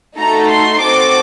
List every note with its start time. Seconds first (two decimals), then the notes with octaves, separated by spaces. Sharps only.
0.19 A3 D#4 F#4 A4 A#5
0.50 C6
0.81 C4 F#4 A4 D6